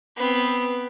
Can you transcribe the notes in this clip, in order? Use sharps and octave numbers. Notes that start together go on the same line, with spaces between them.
B3 C4